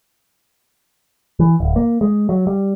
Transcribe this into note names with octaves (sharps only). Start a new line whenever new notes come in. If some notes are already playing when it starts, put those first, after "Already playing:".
E3
D1
A#3
G#3
F#3
G3